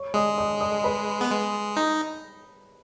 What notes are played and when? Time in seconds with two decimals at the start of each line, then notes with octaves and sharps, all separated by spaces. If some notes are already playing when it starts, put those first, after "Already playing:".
Already playing: C#5 C#6
0.14 G#3 D#5 D#6
0.38 D#5 D#6
0.61 D#5 D#6
0.84 B4 B5
1.21 B3
1.30 G#3
1.77 D#4